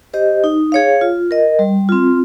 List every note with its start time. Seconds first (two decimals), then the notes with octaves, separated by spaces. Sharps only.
0.14 G4 C5 D#5
0.44 D#4
0.72 G#4 C#5 F5
1.01 F4
1.31 A#4 D#5
1.59 G3
1.89 C4 F4